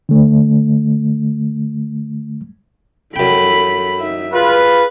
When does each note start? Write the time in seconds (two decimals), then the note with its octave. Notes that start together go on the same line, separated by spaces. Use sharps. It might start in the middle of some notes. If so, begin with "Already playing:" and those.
0.09 D3 A3
3.16 F#2 A4 G5 B5
3.98 D#4 E5
4.33 F4 G#4 B4